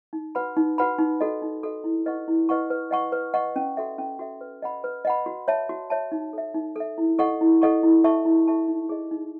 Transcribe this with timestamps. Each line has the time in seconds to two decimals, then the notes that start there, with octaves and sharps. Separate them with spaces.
0.13 D#4
0.35 F#4 B4 F#5 B5
0.57 D#4
0.78 F#4 B4 F#5 B5
0.99 D#4
1.21 F#4 A4 D#5
1.42 D#4
1.63 F#4 A4 D#5
1.84 E4
2.06 B4 D#5 F#5 C#6
2.28 E4
2.49 B4 D#5 F#5 C#6
2.70 B4
2.91 D#5 F#5 C#6
3.12 B4
3.34 D#5 F#5 C#6
3.56 C#4
3.77 F#4 A4 E5
3.98 C#4
4.19 F#4 A4 E5
4.41 B4
4.62 D#5 F#5 B5
4.84 B4
5.05 D#5 F#5 B5
5.26 F#4
5.48 C#5 E5 A5
5.69 F#4
5.90 C#5 E5 A5
6.12 D#4
6.33 A4 E5
6.54 D#4
6.76 A4 E5
6.98 E4
7.19 A4 D#5 F#5 C#6
7.41 E4
7.62 A4 D#5 F#5 C#6
7.83 E4
8.04 A4 E5 A5 C#6
8.25 E4
8.47 A4 E5 A5 C#6
8.68 D#4
8.89 G#4 D#5
9.11 D#4